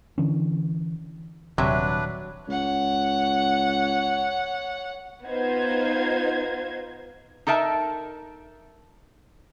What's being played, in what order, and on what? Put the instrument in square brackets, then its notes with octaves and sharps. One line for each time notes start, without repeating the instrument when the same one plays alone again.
[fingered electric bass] D3 E3 C#4
[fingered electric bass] D#1 [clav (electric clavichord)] C3 [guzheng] F#3 C#5 E5 [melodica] D4 B4
[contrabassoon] C#2 [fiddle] C#5 F#5
[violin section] B3 D#4 F4 C5 G#6
[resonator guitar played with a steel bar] D#4 A4 A#4 E5 A5